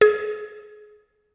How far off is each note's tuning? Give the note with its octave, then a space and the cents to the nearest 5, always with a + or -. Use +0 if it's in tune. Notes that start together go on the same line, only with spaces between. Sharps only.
G#4 +25